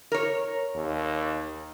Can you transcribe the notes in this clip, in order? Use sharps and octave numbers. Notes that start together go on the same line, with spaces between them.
A#4 C#5
D#2